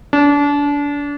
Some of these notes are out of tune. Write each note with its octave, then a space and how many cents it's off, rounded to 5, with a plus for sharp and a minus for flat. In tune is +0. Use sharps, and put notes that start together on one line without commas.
D4 -30